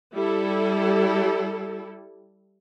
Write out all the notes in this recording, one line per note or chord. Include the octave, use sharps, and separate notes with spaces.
G3 E4 A4